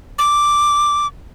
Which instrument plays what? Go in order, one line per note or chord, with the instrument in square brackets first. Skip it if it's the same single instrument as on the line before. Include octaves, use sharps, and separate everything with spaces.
[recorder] D6